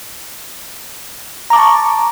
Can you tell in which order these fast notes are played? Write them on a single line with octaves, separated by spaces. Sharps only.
A#5 D6 A5 C#6